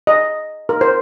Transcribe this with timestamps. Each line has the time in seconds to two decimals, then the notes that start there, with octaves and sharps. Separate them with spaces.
0.07 D#5
0.69 A#4
0.81 C5